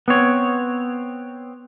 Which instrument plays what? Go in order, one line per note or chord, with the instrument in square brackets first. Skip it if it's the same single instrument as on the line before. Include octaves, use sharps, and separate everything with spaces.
[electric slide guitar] B3 C4 C#5